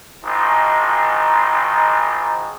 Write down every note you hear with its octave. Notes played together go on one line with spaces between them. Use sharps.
G#1 D#3 F3 G#3 D#4